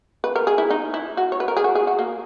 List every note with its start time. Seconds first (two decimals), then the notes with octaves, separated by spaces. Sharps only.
0.24 B4
0.36 A#4
0.47 G#4
0.58 E4
0.70 D#4
0.94 E4
1.17 F#4
1.32 C#5
1.40 B4
1.48 A#4
1.57 G#4
1.64 F#4
1.75 G#4
1.87 F#4
1.99 A#3